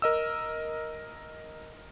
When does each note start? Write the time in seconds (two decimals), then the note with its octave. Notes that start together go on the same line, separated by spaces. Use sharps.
0.02 A#4 D#5 E6